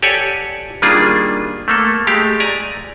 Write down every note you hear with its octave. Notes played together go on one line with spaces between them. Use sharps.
G4 A4 C#5 D5 F#5 G#5
D#3 G3 A#3 D4 F4 G#4
A3 A#3 A4
G#3 A3 G4 F5
D5 G#5 A#5